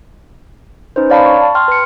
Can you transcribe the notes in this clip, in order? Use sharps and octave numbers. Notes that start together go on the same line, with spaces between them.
C#4 D#4 B4 C5
C#5 D5 F5 A5 B5
C#6
A5
G5 C6 F6
B4 C#7